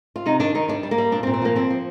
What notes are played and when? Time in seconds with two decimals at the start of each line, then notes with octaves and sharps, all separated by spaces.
0.16 F4
0.26 C3 D#4
0.40 D#3 D4
0.55 D#3 D#4
0.68 G3 D4
0.83 G3
0.91 A#3
0.98 G3
1.12 A#2 D4
1.23 C4
1.27 A#2
1.33 C4
1.42 F3 A#3
1.56 F3 C4
1.71 F3